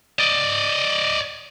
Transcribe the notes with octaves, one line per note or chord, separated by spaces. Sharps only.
D5 D#5